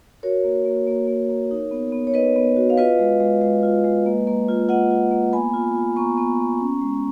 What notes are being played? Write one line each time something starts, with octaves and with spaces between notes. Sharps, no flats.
F#4 A#4 C#5
A#3
A#3
A#3
A#3
A#3
D#4
B3
B3
C#5
D#4 B4 D#5
B3
F#4
F5
F4 B4 D#5
G#3
G#3
G#3
F4
G#3
A#3
A#3
F4
F4 D#5 F#5
F4
A#3
B3 G#5 B5
F4
F4
B3 A#5 C#6
B3
B3
C#4
G#3